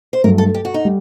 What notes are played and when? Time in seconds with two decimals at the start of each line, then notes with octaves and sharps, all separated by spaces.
0.13 C5
0.24 G2 F#3 A3 A#4
0.38 A4
0.54 G4
0.65 F#4
0.74 D#4
0.85 G3